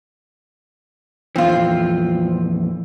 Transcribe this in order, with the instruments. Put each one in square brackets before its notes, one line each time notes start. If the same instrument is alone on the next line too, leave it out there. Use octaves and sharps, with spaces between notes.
[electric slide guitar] F2 A#2 E3 [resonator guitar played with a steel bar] C4 F4